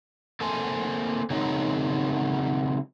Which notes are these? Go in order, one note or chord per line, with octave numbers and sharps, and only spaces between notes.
A#3 C4 A4 C5 G#5
C#3 F#3 G#3 C4 D#4 A#4